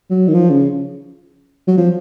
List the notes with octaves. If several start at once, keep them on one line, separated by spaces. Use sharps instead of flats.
F#3
D#3
F3
C#3
F#3
F3